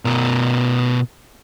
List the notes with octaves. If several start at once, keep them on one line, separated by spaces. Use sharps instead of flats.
B2 A#4